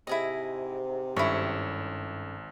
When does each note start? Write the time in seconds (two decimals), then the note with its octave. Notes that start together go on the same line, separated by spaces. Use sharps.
0.07 G#2 C3 E4 G#4 D#5
1.16 G#1 G2 C#4 E4 A4 C#5